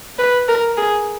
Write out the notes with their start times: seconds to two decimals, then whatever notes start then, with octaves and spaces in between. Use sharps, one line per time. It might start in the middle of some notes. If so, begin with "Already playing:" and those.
0.19 B4
0.48 A#4
0.77 G#4